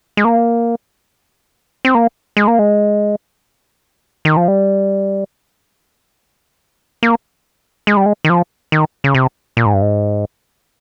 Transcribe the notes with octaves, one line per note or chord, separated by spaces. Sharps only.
G#3
A#3
C4
A#3
G#3
A#3
G#3
D#3
F3
G3
A#3
G#3
G3
G#3
D#3
F3
D#3
C#3
C3
A#2
G#2
G2
G#2